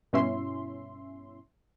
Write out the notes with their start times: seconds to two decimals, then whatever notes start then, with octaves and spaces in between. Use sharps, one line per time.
0.13 G2 B2 C#4 E4 E5 C6